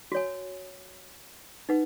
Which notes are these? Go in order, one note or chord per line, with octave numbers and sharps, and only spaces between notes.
F#4 C#5 G#5
D#4 B4 F#5